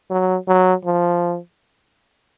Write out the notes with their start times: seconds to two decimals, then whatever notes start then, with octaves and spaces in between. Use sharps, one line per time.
0.10 F#3
0.48 F#3
0.85 F3